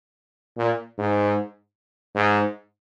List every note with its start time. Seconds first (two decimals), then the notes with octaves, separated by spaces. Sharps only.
0.58 A#2
0.98 G#2
2.15 G#2